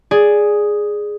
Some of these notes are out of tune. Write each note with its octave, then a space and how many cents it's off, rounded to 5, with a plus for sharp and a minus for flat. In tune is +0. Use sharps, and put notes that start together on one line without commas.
G#4 +0 D5 +0